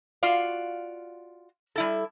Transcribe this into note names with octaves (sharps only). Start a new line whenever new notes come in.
F4 F#4 D5 F5
G3 E4 A4